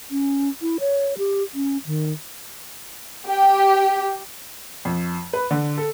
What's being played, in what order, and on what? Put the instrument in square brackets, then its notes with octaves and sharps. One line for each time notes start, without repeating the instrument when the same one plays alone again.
[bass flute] C#4
E4
C#5
G4
C#4
D#3
[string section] G4
[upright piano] F2
B4
D3
A4